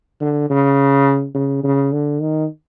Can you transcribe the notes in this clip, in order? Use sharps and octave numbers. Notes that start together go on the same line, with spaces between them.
D3
C#3
C#3
C#3
D3
D#3